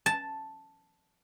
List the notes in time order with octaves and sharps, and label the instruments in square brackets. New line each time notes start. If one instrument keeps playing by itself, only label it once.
[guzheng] A5